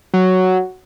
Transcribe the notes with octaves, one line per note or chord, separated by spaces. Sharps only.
F#3